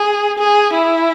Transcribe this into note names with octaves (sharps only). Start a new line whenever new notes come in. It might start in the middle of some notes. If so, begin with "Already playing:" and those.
Already playing: G#4
G#4
E4